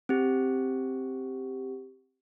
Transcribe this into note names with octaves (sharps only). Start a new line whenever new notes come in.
C4 G4